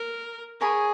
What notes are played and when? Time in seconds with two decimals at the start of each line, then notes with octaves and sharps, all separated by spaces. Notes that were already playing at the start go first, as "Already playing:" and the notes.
Already playing: A#4
0.60 G#4 A#4 C#5 G#5 B5